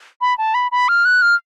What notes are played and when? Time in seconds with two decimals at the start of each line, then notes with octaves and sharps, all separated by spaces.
0.21 B5
0.38 A5
0.54 B5
0.72 B5
0.89 F6
1.05 F#6
1.22 F6